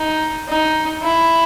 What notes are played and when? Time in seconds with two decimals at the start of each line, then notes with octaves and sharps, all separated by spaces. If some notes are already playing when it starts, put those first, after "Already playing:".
Already playing: D#4
0.48 D#4
1.02 E4